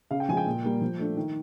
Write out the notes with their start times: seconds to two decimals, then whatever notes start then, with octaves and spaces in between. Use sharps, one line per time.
0.11 C#3 F5
0.20 G5
0.29 F3 G#5
0.33 G#3 G5
0.46 A#2
0.64 G3 A#3
0.82 F3
0.99 A3 D4
1.17 D#3